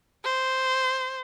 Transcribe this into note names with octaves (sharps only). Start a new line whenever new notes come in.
C5